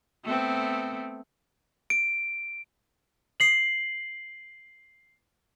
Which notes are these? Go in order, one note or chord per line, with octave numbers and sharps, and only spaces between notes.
A3 B3 C4
D7
C7 F#7